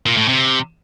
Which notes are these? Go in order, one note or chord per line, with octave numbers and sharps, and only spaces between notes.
A#2
A2
C3